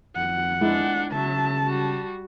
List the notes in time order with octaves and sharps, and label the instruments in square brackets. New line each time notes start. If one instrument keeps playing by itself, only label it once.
[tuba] F2 [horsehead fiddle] F#5
[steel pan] G#3 E4 [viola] D4 F4
[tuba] C#3 [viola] F#3 E5 [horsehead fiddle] A5
[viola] G3 F#4